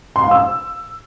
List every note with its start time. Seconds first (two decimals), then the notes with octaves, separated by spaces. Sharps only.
0.16 C6
0.23 F5
0.31 E6